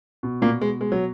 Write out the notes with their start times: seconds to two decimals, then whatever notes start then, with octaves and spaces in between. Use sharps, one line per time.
0.23 B2
0.42 A#2 A#3
0.61 G#3
0.81 G#3
0.92 F#3